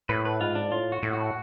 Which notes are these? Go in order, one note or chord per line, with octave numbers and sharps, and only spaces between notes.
A2 B4
B4
G#2 F4
D4
A2 F4
F#4
A2
F#4